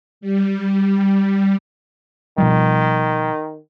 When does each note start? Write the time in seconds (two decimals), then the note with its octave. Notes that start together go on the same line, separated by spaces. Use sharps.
0.21 G3
2.38 B2 D#3 F3 G3